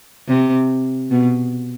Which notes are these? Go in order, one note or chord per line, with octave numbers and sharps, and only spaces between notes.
C3
B2